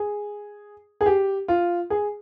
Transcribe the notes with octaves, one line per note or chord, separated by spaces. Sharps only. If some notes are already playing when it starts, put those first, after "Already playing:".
Already playing: G#4
G#4
G4
F4
G#4